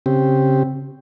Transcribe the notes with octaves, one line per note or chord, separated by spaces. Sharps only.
C#3 C4 G4